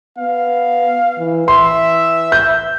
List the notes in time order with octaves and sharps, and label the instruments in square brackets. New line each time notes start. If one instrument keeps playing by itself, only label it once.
[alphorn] B3 [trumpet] F5
[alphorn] E3
[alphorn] E3 [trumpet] E5 [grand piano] C6
[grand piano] G6